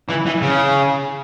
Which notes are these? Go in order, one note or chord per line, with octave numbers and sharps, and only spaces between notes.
E3
E3
C#3